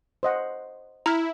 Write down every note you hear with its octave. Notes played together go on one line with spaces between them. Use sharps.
C5 D#5 F#5
E4 A#5 F6